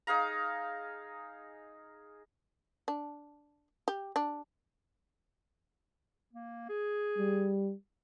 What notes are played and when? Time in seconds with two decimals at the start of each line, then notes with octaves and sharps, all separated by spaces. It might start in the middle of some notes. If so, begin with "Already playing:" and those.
0.07 D#4 G#4 F5 A#5
2.88 D4
3.88 G4
4.16 D4
6.33 A#3
6.69 G#4
7.18 G3